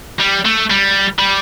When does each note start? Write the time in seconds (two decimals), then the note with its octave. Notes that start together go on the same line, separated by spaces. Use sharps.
0.20 G3
0.46 A3
0.70 G3
1.19 G3